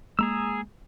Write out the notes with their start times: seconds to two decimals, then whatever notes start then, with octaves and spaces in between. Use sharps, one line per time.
0.19 G#3 A#3 G#4 A#5 E6